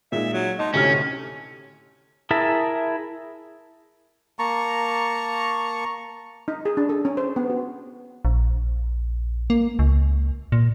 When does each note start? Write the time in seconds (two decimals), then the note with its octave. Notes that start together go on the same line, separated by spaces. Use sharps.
0.12 A#2 G#3 D#4 E5
0.33 F#3
0.59 D#4 D#5 A5 C6
0.74 D2 A2 C3 C#4 F6
2.31 E4 G#4 A#4 E5 A5
4.39 A#3 A5 A#5 C#6
6.48 D#4
6.65 G#4
6.77 D4
6.89 A4
7.05 C#4
7.17 C5
7.36 B3
7.50 F#4
8.25 A#1
9.50 A#3
9.79 C#2
10.52 A#2